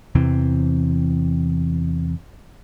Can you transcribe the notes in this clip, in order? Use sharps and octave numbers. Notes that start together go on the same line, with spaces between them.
E2 C3 E3 C4